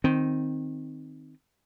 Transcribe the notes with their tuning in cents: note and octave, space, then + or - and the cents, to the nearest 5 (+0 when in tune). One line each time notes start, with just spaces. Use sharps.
D#3 -5 C4 +0